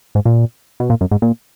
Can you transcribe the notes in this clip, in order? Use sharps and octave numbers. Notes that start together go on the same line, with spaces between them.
G#2
A#2
B2
A#2
F#2
G#2
A#2